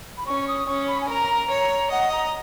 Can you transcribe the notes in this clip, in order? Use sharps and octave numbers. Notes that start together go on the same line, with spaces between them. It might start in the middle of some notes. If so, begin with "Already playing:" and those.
B5
C#4 C#6
D#6
C#4 C#6
B5
G#5
A#4 A#5
C#5
D#5 F#5
A#5